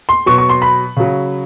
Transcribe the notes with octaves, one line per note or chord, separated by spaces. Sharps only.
C6
B2 F#3 C#6
C#6
C6
B5
C#3 F#3